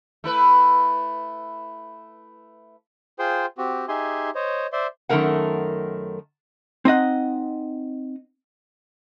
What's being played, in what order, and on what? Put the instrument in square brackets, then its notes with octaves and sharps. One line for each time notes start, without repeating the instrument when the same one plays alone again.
[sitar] A3 E4 B4
[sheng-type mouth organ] F4 G#4 C5 G5 C6
C4 F#4 G4
D#4 G4 G#4 E5 G#5 C6
C5 C#5 D#5
C5 D5 E5 C6
[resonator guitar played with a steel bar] F#2 D#3 F#3 A3 A#4 F#5
[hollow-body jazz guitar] C4 D#4 D#5 F#5